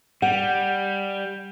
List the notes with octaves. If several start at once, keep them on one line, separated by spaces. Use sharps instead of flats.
G3 F#5